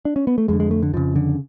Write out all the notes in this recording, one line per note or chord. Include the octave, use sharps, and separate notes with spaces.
D4
C#4
B3
A3
F2 D3 G#3
G#3
A3
D3
F2 C#3 F3
D3